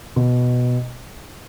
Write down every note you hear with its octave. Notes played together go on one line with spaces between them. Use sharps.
B2